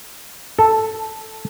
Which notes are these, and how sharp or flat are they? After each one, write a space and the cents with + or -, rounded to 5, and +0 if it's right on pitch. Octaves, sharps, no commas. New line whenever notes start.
A4 +0